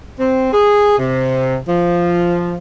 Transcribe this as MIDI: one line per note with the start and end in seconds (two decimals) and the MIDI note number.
0.19 0.51 60
0.52 0.98 68
0.98 1.57 48
1.68 2.56 53